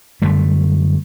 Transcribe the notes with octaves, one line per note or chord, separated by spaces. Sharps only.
F#2 D3 G3 A3